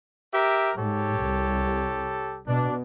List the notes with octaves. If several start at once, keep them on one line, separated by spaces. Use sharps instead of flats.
G4 A#4 E5
G#2 G4 A4 C#5
C2
B2 D4